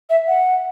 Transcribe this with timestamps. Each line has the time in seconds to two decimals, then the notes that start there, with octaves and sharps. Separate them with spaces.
0.10 E5
0.28 F#5